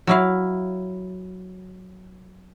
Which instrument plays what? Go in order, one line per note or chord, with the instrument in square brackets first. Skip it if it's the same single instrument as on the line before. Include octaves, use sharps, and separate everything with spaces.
[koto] F#3 E4 F5